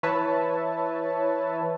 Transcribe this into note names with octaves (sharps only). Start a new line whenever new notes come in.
E3 B4 C#5 E5 A5